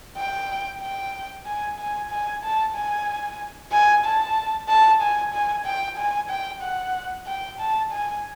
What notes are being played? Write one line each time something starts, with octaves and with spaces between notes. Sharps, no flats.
G5
G5
G#5
G#5
G#5
A5
G#5
G#5
A5
A5
G#5
G#5
G5
G#5
G5
F#5
G5
A5
G#5